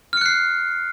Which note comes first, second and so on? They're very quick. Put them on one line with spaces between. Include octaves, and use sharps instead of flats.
F6 C#7 F#6 C7